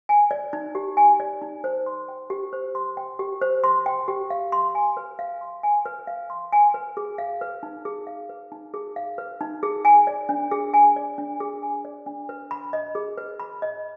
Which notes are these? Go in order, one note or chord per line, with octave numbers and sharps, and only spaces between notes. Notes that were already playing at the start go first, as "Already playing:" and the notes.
G#5
D5
D#4
G4
G#5
D5
D#4
C5
C6
G5
G4
C5
C6
G5
G4
C5
C6
G5
G4
F5
C6
G#5
B4
F5
C6
G#5
B4
F5
C6
G#5
B4
G#4
F5
B4
D#4
G#4
F5
B4
D#4
G#4
F5
B4
D#4
G#4
G#5
D5
D4
G#4
G#5
D5
D4
G#4
G#5
D5
D4
B4
B5
D#5
G#4
B4
B5
D#5